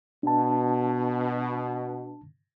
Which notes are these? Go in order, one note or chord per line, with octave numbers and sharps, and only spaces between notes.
B2 D4 A5